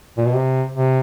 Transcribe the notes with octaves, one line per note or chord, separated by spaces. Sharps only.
A#2
B2
C3
C3